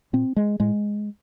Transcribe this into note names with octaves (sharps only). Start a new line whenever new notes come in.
A#2 C4
G#3
A2 G#3